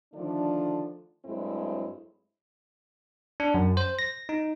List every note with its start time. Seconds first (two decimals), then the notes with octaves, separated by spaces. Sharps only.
0.13 D3 D#3 F3 A3 D4
1.25 G2 F#3 G#3 A3 C4 E4
3.40 D4
3.54 F#2
3.77 C5
3.99 A#6
4.29 D#4